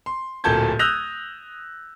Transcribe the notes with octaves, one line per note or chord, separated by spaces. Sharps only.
C6
D1 A#2 A4 A5 G6 G#6
D#6 E6 F#6 G6 A#6 F7